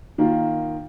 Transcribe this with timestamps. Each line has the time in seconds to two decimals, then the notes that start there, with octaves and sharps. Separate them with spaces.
0.18 D#3 A#3 F4